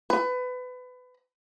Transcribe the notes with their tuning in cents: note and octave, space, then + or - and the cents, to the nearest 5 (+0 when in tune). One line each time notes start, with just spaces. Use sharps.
B4 +25